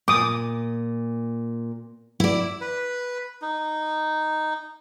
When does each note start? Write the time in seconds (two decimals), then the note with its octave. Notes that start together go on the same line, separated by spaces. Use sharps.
0.08 A#2 D6 D#6
2.20 E4 D5
2.61 B4
3.42 D#4